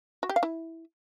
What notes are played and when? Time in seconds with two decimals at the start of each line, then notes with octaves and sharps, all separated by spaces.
0.23 F#4
0.29 G4
0.36 F5
0.43 E4